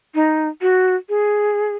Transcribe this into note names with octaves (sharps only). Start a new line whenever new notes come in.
D#4
F#4
G#4